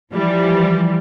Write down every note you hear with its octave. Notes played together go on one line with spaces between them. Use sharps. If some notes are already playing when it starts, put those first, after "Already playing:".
E3 F3 G3